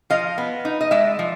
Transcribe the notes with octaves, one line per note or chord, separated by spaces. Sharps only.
F3 D#5 F5
B3
D#4
D#5
G#3 D5 E5
F3